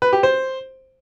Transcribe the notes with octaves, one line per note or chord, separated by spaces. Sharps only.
B4
G4
C5